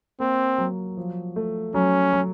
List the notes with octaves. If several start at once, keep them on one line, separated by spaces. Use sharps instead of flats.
A#3 C4
F#3
F3
A3
F#3 C#4
F#3